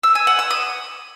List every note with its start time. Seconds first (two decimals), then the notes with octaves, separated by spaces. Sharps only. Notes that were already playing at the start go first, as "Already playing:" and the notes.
0.03 E6
0.15 G#5
0.27 F#5
0.39 E6
0.51 D#6